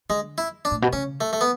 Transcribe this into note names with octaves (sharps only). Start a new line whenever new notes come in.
D3 G#3
E4
D4
A2
B2
C#3 C#4
A3
A3
B3